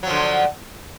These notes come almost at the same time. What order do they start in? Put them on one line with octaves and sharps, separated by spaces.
F#3 F3 D3